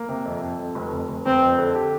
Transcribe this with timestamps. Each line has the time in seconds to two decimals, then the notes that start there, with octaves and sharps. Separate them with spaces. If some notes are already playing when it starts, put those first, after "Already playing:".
Already playing: A#3
0.09 C3
0.25 F2
0.42 F2
0.59 F2
0.75 F1
0.92 F1
1.08 F1
1.26 F1 C4
1.42 F2
1.59 D3
1.75 G4